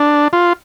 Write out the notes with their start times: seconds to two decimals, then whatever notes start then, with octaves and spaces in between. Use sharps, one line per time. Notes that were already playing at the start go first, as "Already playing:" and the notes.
Already playing: D4
0.33 F4